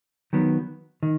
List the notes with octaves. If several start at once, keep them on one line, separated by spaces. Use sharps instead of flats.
D#3 F#3 B3
D#3